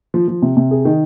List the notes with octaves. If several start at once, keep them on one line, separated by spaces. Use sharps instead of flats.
F3
F3
C3
C3
G#4
D#3